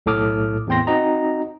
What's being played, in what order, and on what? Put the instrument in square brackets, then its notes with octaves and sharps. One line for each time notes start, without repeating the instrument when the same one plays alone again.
[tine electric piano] B1 A2 A4 D6 D#6 F6
E2 A2 C4 G5 C6 A#6
C4 D#4 F#4 D#5 A#5